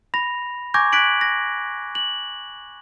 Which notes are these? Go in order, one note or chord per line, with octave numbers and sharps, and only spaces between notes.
B5 A#6 F7
G#5 C#6 D6 G6 G#6 A#6
F#6 G#6 B6 D7 F#7
A#6
F#7